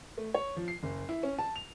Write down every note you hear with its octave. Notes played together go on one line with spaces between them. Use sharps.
A3
C#5
F3
C7
F#1
E4
C#4
A5
F7